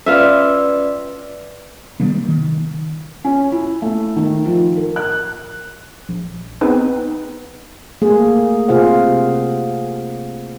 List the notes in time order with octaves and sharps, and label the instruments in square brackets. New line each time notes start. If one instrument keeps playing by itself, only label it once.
[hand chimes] C#4 B4 D5 [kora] F4 E5
[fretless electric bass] C3 D#3 G3 A#3
D#3
[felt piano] C#4
E4
A3
D#3
F3
A#4
F#6
[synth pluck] A#1
B3 C4 D#4 G#4 B4
[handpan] A3 A#3 G#4
C3 F4 G#4 C5 F5 F#5